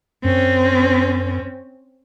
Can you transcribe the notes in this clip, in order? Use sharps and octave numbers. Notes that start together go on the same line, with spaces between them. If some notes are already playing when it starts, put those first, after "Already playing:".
F#2 C4 C#4